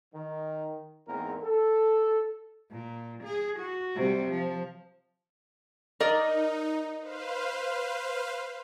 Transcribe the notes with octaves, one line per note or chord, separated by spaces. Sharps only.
D#3
E2 G#2 A#3 C4 A#4
A4
A#2
G#4
F#4
C3 G3
F3
D#4 A#4 D5 D#5
B4 C5 F5